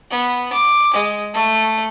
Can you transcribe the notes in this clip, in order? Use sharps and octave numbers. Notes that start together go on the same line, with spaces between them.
B3
D6
G#3
A3